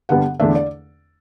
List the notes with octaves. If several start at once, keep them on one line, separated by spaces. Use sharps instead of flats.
G2 D3 G3 B3 F#5
E2 D3 A3 D4 E5
D5